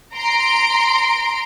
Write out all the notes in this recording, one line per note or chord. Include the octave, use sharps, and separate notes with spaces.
A#5 C6 D7